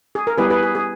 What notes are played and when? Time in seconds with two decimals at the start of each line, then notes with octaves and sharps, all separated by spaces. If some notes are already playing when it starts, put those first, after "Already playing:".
0.15 G#4
0.27 A#4
0.38 G3 B3 E4 G4 G#4 B4
0.50 G#4 B4
0.63 G#4
0.75 G#4